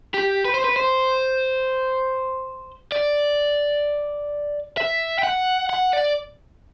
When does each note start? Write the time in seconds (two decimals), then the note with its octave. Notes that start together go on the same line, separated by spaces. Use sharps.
0.14 G4
0.45 B4
0.54 C5
0.64 B4
0.76 C5
2.92 D5
4.77 E5
5.19 G5
5.23 F#5
5.70 F#5
5.93 D5